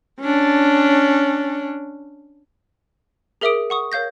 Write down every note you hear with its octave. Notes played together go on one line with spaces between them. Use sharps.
C#4 D4
G#4 A#4 E5 D6 D#6 D7
F#5 C#6 D#6
A#4 C#5 F5 G6 A#6